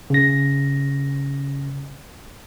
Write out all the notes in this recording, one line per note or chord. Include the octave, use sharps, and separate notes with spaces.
C#3 A#6